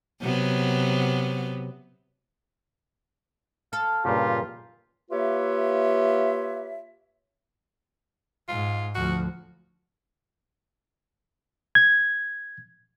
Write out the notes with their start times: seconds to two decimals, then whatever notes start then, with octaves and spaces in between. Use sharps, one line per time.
0.21 C3 F#3 B3
3.73 A4 F5
4.05 G2 A#2 C#3 F4 G4
5.11 A#3 F4 G4 B4 C#5 E5
8.49 G#2 F4
8.95 D2 F3 F#4
11.75 G#6